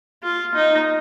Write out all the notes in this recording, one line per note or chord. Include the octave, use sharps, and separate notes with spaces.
F4
D#4